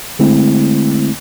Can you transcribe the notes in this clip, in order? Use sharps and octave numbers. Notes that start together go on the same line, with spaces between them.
D3 G#3 A3 C4 E4